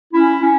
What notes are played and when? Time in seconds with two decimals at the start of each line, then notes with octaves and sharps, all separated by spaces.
0.13 C#4 E4
0.42 C#4